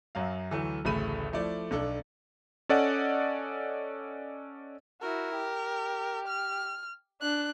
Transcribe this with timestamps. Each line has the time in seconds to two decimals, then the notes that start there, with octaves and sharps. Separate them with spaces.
0.15 F#2 F#3 F5
0.51 D2 E3 F#3 A3
0.84 D1 A1 C#3 A3 B5 D#7
1.33 F3 A3 E4 D5
1.71 B1 D4 A4
2.69 C#4 A4 D5 D#5 F#5
5.02 E4 F#4 A#4
5.35 G4
6.28 F6
7.22 D4 F#6